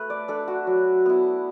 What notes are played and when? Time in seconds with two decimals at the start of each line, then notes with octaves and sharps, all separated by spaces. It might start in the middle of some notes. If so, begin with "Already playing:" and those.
Already playing: A3 B4
0.10 D5
0.28 D4 A4
0.48 F#4
0.67 F#3
1.06 B3 E4